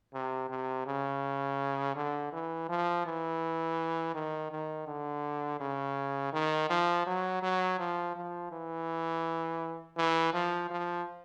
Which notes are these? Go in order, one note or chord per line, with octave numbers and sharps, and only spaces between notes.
C3
C3
C#3
D3
E3
F3
E3
D#3
D#3
D3
C#3
D#3
F3
F#3
F#3
F3
F3
E3
E3
F3
F3